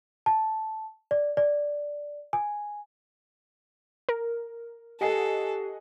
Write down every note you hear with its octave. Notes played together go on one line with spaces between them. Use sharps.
A5
D5
D5
G#5
A#4
G4 A4 D#5 F#5 G#5 C7